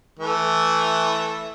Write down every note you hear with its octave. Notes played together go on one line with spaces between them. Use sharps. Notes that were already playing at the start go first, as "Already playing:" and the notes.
E3 A3